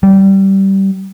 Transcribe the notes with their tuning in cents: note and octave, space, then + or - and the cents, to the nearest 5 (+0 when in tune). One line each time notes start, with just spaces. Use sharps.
G3 -20